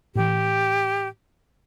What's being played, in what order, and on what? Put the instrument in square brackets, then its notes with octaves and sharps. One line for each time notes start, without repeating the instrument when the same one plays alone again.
[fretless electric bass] A2 E3 [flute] G4